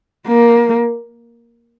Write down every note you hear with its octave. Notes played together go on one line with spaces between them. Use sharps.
A#3